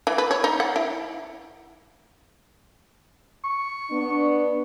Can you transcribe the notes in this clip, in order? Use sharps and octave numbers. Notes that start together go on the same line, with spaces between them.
E3
B4
C#5
D#4
F#5
E4
C#6
B3 D4